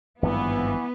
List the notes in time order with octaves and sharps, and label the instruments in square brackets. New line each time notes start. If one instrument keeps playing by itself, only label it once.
[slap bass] G#1 G2 F3 [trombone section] E3 [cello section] B3